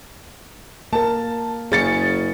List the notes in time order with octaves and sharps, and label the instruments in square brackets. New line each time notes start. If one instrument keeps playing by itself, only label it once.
[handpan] A#3 A#4 [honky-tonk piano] A5
[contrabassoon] F#1 [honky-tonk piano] C#4 A6 C#7 [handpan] G#4